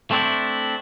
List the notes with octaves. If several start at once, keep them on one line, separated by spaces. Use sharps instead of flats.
A3 C4 D4 E4